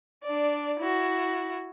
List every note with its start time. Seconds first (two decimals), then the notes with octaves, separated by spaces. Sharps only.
0.23 D4 D5
0.80 E4 F#4